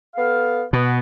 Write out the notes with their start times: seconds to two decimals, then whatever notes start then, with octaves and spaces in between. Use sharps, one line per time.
0.16 B3 A4 F5
0.73 B2 B3